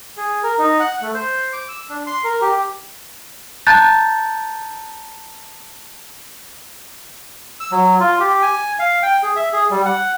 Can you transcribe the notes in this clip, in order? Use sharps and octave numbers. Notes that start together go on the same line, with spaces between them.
G#4
A#4
D#4
F#5
A3
C5
D6
E6
D4
C6
A#4
G4
A5 A#5 F#6 G6 A6
E6
F#3
F4
G4
G#5
F5
G5
G#4
E5
G#4
G3
F#5